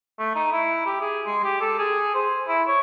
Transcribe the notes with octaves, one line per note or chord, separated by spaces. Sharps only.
A3
D#4
E4
G4
G#4
G#3
G4
A4
G#4
C5
E4
C#5